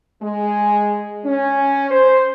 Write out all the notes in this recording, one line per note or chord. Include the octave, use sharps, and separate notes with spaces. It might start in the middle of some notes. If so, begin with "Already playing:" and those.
G#3
C#4
C5